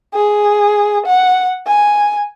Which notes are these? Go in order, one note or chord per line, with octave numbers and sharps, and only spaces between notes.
G#4
F#5
G#5